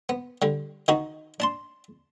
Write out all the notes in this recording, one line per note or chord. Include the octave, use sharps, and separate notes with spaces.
B3
D3 G3
D#3 D#4 F#4
D4 A5 C6